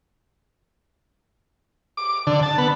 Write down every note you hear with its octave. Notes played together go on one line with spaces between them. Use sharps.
D6
D3
A5
B3